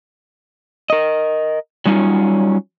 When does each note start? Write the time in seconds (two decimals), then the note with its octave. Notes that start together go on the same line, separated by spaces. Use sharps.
0.90 A#4 D#5
1.86 F#3 G3 C#4 D#4 F4